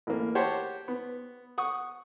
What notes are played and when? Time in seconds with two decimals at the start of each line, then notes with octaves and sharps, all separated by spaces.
0.07 A1 A#3
0.35 G4 C5 C#5 F#5 A5
0.88 B3
1.58 F#5 C#6 D#6